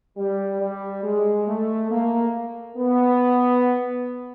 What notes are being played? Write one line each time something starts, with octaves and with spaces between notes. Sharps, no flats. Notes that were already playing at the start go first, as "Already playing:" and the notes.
G3
G3
G#3
A3
A#3
B3